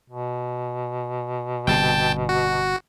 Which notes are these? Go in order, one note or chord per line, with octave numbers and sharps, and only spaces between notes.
B2
G1 C3 G5 A5
F#4